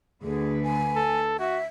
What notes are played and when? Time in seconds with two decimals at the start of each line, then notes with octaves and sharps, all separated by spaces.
0.23 D2 D3 G#4 B4
0.63 G#5
0.96 A4
1.39 F#4 E5